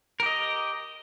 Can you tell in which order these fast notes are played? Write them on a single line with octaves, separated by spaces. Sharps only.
A#4 G4 D#5